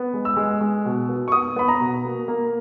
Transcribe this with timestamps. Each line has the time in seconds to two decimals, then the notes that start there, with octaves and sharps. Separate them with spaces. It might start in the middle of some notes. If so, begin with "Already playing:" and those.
Already playing: B3
0.14 G#3
0.25 E6
0.37 G#3
0.61 G#3
0.85 B2
1.09 B3
1.28 C#6
1.32 B3 D#6
1.56 B3 B5
1.68 A#5
1.80 B2
2.05 A#3
2.28 A#3